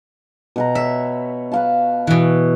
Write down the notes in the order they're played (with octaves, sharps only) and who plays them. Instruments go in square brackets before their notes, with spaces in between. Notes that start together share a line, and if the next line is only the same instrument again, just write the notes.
[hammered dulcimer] B2 B4 A#5
[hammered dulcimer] C#5 [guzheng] E5
[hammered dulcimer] B4 F5 A5
[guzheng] B2 E3